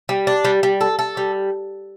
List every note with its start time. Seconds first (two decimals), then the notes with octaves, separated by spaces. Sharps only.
0.09 G3
0.27 D4
0.45 G3
0.63 G3
0.81 A4
0.99 A4
1.17 G3